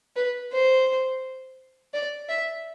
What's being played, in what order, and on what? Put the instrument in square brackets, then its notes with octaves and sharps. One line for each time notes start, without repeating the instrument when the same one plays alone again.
[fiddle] B4
C5
D5
E5